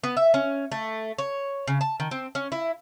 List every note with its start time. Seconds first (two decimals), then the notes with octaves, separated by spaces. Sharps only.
0.04 B3
0.17 E5
0.34 C#4
0.72 A3
1.18 C#5
1.68 C#3
1.81 A5
2.00 D#3
2.11 C4
2.35 C#4
2.52 E4